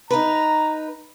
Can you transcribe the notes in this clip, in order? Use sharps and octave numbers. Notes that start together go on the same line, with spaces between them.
D#4 B4 A#5